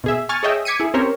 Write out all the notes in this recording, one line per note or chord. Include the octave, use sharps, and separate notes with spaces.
B2 G#4 E5
G#5 C#6 F6 A6
G#4 C#5 D#5 E5 G5
D6 G#6 B6 C#7 D#7
E4 G#4
C4 C#4 G4 A#4 C5 C#5